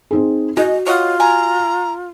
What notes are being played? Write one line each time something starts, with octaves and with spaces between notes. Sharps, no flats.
C4 D#4 G#4
G#3 F#4 D#5
F4 C#5 D#5 F#5
G#5 A#5